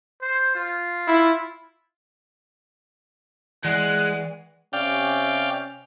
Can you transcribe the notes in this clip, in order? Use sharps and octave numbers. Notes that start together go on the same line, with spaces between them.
C5
F4
E4
E3 G#3 D5 F#5 F#6
C3 C#4 D5 F5 G5